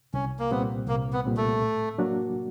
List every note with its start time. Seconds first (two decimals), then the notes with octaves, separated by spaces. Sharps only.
0.14 C2 C#4
0.39 A#3
0.51 A#2 G3 B3 C4
0.88 C2 A#3
1.13 B3
1.25 A#2 G3 C4
1.37 A3
1.62 A2
1.98 F#3 A#3 D4 F#4